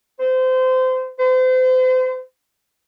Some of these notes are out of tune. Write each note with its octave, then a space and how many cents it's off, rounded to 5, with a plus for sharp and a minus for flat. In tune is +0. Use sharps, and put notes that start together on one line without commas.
C5 -25
C5 -35